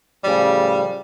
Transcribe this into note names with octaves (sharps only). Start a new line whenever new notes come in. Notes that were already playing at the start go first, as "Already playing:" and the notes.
A2 C#3 F3 G3